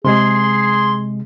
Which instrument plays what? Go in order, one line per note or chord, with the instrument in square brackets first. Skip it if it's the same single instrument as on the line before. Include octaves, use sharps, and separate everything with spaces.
[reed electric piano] C3 G#3 [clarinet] G#4 [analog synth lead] C6